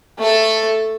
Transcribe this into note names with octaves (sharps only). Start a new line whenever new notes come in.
A3 A4